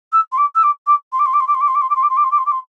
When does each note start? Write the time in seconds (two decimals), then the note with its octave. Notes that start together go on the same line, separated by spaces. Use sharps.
0.12 E6
0.32 C6
0.37 D6
0.55 E6
0.63 D6
0.87 D6
1.12 C6
1.19 D6
1.26 C6
1.33 D6
1.40 C6
1.47 D6
1.54 C6
1.61 D6
1.68 C6
1.75 D6
1.81 C6
1.90 D6
1.95 C6
2.03 D6
2.09 C6
2.17 D6
2.24 C6
2.31 D6
2.38 C6
2.46 D6
2.51 C6